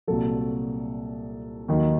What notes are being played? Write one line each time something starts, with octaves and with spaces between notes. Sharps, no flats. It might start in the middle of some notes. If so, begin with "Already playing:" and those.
C2 A#2 F#3 A4
D#2 D#3 F#3